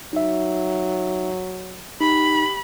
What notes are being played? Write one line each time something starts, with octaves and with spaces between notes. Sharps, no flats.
F#3 D#4 E5
D#4 G4 B5